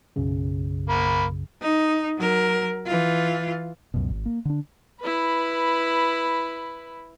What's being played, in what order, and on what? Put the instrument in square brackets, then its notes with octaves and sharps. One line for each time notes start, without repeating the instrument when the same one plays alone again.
[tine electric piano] B1 F#2 C#3
[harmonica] A#3 B5
[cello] D#4
F#3 A#4
E3 F4
[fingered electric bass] C#2 F#2 B2
G#1
A#3
D3 D4
[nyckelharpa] E4 B4